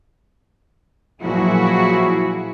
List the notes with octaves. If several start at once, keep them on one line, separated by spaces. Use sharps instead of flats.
A#2 F3 F#3 E4 F#4 G#4